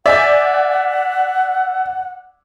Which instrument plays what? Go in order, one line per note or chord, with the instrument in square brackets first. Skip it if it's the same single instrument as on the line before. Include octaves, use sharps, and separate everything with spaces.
[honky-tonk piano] D5 G#5 G6 [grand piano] E5 [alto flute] F#5